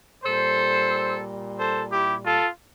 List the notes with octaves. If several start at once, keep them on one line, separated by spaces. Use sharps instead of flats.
A#2 G3 A4 C5
A4 C5
E4 G4
F4 A4